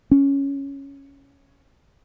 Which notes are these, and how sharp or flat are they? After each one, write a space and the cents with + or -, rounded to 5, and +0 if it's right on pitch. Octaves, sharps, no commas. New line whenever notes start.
C#4 +0